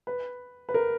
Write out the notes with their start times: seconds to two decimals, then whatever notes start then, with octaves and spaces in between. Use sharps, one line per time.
0.07 B4
0.69 B4
0.74 A#4